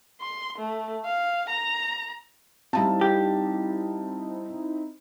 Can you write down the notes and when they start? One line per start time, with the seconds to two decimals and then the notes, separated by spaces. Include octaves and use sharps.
0.21 C6
0.59 A3
1.05 F5
1.50 A#5
2.73 G3 C4 D#4 E4 F5 A5
3.01 G4